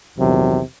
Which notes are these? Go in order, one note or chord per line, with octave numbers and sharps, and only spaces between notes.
A#1 E2 C3 D#3 F#3